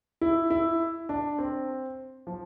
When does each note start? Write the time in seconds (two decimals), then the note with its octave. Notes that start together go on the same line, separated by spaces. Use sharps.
0.21 E4
0.50 E4
1.09 D4
1.39 C4
2.27 F3